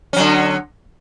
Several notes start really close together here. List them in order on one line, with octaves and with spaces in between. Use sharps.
C#4 F#3 D3